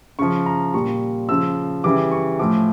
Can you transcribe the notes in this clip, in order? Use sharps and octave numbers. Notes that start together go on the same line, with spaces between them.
C#3 F3 C#6
A#5
A#2 G3 C#6
C#3 F3 E6
C#3 E3 G3 D6
C#6
A2 F3 D6